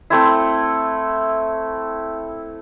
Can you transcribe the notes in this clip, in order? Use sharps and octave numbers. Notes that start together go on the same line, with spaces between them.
A3 C4 E4